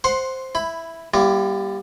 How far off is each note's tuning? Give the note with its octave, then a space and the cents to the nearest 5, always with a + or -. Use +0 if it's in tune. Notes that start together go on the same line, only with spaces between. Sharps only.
C5 +0 F#5 +0 C6 +15
E4 +0 B5 +15
G3 +0 A#3 +45 E4 +45